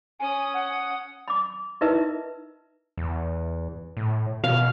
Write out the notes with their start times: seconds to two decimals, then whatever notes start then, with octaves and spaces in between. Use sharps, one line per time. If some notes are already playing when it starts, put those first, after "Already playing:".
0.20 C#4 G#5 D#6
0.54 F#5
1.28 B5 D6
1.81 D#4 E4 A#4 B4 D#5 E5
2.98 E2
3.97 A2
4.44 B2 F5